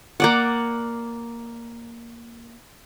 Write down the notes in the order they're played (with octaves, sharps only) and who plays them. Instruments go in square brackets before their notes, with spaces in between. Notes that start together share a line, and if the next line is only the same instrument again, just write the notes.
[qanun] A#3 D5 F#5